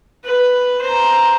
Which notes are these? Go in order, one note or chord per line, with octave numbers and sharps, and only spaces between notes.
B4
C5 A#5